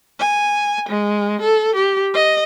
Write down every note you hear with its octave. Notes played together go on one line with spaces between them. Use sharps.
G#5
G#3
A4
G4
D#5